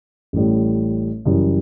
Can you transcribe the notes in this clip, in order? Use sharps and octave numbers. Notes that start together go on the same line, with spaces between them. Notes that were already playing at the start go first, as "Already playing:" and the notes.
A1 A2 G3
F#1 F#2 E3 G3